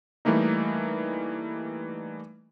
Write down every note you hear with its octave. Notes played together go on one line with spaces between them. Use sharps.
E3 G3 A3 A#3 D#4